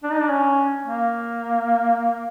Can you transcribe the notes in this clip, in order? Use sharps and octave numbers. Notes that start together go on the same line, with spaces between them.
D4
D#4
D4
C#4
A#3